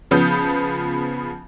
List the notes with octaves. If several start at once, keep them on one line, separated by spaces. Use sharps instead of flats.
C#3 F3 B3 D#6 G6